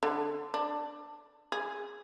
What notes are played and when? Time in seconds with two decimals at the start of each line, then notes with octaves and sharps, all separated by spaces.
0.03 D3
0.54 D4
1.52 G#4